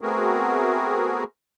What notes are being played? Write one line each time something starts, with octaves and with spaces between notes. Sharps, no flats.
A3 B3 C4 F#4 G#4 A#4